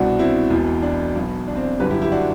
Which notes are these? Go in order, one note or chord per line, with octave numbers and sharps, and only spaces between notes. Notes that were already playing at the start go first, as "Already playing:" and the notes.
Already playing: C2 B2 D4 F#4
C4 E4
E1 E2 B2
D4
B1 B2
D4
C4
D4
G1 F#2 D3 G4 B4
E4 G4
E4 G4
D4 F#4